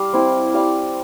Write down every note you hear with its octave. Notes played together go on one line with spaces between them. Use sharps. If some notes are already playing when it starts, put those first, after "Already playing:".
Already playing: G3 D5 F5
C4 E4
G3 D5 F5